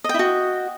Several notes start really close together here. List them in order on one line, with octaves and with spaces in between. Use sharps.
D#5 G5 E4 F#4